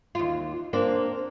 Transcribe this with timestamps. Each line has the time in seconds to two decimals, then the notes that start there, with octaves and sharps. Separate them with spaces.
0.15 D#2 F4
0.73 A#3 C4 D4